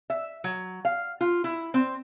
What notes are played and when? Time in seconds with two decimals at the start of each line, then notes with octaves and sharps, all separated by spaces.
0.10 E5
0.44 F#3
0.85 F5
1.21 F4
1.44 E4
1.74 C4